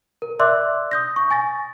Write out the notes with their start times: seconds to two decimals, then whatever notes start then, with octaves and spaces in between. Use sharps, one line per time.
0.22 A#4
0.39 D5 E5 C6 D6 E6 F#6
0.91 D#6 G6 A#6
1.16 C#6
1.31 G#5 A6 A#6